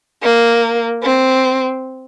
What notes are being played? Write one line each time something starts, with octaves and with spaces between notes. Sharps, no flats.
A#3
C4